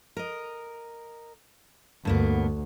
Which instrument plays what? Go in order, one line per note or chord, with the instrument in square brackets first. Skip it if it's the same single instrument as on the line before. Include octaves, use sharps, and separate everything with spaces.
[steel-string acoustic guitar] A#4 D#5
[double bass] D2 [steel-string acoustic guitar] G2 A#3 B3